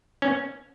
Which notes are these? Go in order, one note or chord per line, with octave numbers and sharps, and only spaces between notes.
C#4